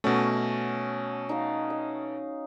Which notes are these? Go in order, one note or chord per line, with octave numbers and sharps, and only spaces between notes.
B2 A3 C#4 F#4
D#4 F5
D#5